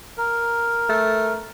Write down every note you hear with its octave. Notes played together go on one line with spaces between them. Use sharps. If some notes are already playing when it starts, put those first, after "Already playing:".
A#4
A3